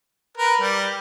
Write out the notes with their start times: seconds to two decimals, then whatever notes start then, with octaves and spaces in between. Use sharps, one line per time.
0.37 A#4 B4
0.61 G3